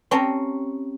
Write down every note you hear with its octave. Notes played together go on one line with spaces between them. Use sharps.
C4 C#4 G4 A5 A#5